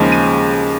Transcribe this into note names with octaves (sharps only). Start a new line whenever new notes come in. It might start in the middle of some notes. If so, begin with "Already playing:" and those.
Already playing: D#2 C#3 F3 G#3
D#7